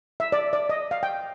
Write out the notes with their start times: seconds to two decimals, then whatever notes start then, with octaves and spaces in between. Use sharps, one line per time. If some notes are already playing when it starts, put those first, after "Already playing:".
0.20 E5
0.32 D5
0.53 D5
0.69 D#5
0.91 F5
1.03 G5